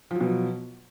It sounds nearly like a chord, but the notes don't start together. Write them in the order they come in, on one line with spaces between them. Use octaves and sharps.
F3 F#3 B2